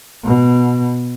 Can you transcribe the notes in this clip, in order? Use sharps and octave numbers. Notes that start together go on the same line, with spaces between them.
B2